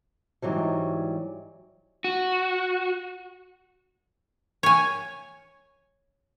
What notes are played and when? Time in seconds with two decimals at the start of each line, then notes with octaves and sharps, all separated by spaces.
0.42 G#2 E3 F#3 G3
2.04 F#4
4.63 C#5 G#5